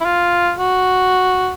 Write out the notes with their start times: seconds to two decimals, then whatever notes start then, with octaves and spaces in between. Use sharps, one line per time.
0.01 E4
0.05 F4
0.58 F#4